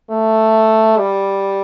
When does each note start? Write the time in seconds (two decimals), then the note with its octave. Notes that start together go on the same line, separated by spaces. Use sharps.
0.10 A3
0.97 G3